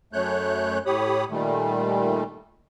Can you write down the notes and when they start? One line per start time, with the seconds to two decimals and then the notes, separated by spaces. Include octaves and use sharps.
0.13 F#2 A3 C#5 F#6 G6
0.86 A2 G4 C#5 B5 D#6
1.31 A#2 D#3 G3 A3